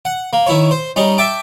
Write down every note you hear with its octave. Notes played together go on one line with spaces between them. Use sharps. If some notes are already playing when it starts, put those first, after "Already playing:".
F#5
A#3
D#3 E4 C#5
C5
G3 C#4 D#4
E5 G5 A5 D6